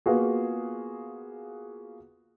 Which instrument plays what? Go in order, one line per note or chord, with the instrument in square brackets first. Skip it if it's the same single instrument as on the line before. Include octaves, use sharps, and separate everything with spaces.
[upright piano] A#3 B3 F4 F#4 G#4